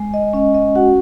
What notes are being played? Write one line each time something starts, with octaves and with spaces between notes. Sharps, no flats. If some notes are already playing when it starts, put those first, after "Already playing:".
Already playing: G#3
D#5
C#4 D#5
D#5
F#4 F#5